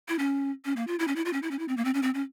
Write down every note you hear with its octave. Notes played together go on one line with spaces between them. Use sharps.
E4
C#4
C#4
A#3
F4
E4
C#4
E4
F4
C#4
E4
C#4
E4
C4
A#3
C4
C#4
C4
C#4